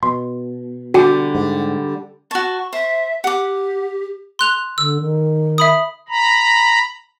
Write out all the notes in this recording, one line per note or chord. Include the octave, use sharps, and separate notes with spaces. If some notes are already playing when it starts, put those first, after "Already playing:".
B2 C6
D3 G3 F#4 G4 F#5
G#2
F#4 A5 C#6
C5 E5
G4 F#5 D6
C6 F#6 F7
D3 E6
D#3
E5 B5 D#6
A#5 B5